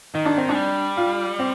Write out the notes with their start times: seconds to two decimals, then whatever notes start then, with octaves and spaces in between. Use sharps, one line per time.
0.14 D#3 D#4
0.25 D4
0.37 C4
0.48 G#3 D4
0.55 G3
0.97 F4
1.39 C4